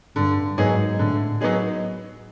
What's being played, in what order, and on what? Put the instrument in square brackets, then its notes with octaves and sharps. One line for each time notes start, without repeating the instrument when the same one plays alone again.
[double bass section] G2 [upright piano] D3
[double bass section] G#2 [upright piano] F#3 B3 D#4 G#4
[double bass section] A2 [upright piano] D3
[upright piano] F#3 B3 D#4 G#4